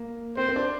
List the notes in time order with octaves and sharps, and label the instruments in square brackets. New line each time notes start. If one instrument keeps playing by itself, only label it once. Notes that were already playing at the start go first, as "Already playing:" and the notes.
Already playing: [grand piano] A#3
[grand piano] C4 [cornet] C5
[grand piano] C4
D4